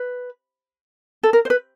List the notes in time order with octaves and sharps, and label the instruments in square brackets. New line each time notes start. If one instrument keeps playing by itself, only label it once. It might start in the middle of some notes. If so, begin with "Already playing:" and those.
Already playing: [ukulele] B4
A4
A#4
C5
B4